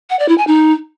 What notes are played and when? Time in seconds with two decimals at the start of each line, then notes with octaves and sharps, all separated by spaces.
0.10 F#5
0.19 D5
0.28 E4
0.38 G#5
0.47 D#4